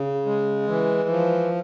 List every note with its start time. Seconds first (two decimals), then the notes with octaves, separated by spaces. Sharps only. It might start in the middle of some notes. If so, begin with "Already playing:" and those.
Already playing: C#3
0.26 G#3
0.68 E3
1.09 F3